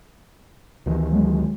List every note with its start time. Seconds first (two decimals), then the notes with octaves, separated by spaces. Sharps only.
0.86 D2 D#3 E3
1.12 F#3 G#3